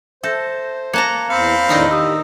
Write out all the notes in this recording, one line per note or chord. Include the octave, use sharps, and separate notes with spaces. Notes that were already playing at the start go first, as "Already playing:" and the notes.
A4 C5 E5 G6 A#6
A#3 A5 A#5 F#6 G#6 C#7
E2 C4 F5 B5 C#7
E2 A2 D#3 D4 D#4 A#4
G4 D#6 E6